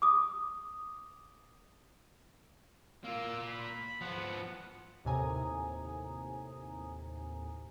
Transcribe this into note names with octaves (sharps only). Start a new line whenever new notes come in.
D6 D#6
A#3 F4 E6
B5
F3 B3 F#5
D#2 A2 C3 G#5 A#5 D#6